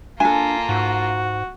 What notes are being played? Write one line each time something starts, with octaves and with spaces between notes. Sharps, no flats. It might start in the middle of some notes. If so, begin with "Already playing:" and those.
A#3 D4 F4 A4 G#5
G#2 F#4